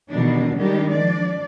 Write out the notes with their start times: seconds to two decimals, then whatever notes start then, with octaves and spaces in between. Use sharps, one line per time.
0.10 E2 B2 D3 D#3 G3 D4
0.55 D#3 G3 G#3 D4 G4
0.90 F3 D4 D5